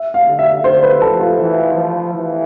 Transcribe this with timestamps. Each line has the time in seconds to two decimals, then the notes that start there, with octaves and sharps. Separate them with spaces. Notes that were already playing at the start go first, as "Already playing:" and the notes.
Already playing: E5
0.14 F5
0.27 D3
0.39 E5
0.64 D3 C5
0.83 B4
1.01 F3 A4
1.20 F4
1.39 E3
1.75 F3
2.13 E3